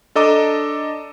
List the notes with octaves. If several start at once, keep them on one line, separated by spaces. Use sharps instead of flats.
D4 A4 D#5 A#5 D6